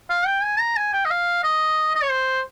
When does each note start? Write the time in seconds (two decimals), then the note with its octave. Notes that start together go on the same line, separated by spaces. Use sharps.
0.10 F5
0.27 G5
0.43 G#5
0.59 A#5
0.76 G#5
0.93 G5
1.05 D#5
1.11 F5
1.43 D#5
1.95 D#5
2.03 C#5
2.11 C5